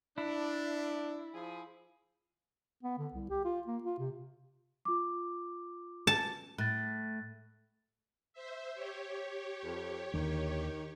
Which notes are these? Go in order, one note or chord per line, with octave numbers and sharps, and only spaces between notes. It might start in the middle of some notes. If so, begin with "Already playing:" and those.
D4 E4
F3 G#4
B3
D3
C2
G4
F4
A#3
F4
C3
F4 D6
A5
A2 F#6 A6
C5 E5
G4 C#5
F2
D#2 D3 D#3